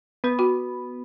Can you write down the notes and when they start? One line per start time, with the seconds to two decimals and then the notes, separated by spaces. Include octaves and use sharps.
0.24 B3 B4
0.39 F#4